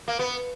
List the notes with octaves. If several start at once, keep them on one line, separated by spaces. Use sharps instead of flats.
A#3
B3